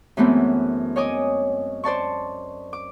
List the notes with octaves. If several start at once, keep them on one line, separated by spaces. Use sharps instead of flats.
F#2 E3 G#3 A3 B3 C4
C#5 D#5 G#5 D6 D#6
C5 D5 A5 C#6
D6